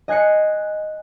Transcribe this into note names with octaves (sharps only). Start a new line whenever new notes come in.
D#5 G#5 F#6 C7 C#7